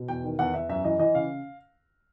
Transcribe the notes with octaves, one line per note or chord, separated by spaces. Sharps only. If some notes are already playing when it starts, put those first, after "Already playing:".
Already playing: B2
E2 G5
D#3
E2 F#5
E2 E5
F#2 E5
E3 D#5
E3 D#5
C#3 F5